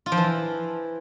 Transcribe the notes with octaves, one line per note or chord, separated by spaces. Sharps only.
F4
F3
E3